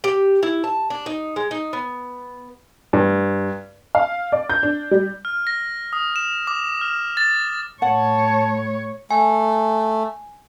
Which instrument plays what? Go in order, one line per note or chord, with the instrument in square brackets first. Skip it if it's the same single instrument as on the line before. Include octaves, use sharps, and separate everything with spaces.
[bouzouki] G4
E4
A5
D4
D#4
G#3
D#4
B3
[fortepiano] G2
[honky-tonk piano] F5
D5
G6
D4
G3
[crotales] F6
A#6
D#6
E7
D6
F6
A6
[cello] A2 C#5 [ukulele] F#5 [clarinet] A5
[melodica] A3 [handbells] G#5